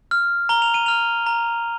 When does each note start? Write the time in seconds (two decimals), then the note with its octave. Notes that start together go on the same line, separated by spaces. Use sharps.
0.11 F6
0.49 A#5 G7
0.62 F7
0.74 D#7
0.86 F6 F7
1.26 A#5